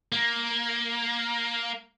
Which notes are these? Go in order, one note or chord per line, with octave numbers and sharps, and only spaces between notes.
A#3